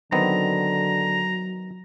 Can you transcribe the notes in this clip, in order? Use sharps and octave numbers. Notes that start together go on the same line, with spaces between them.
D3 D#3 F#3 B3 C4 A#5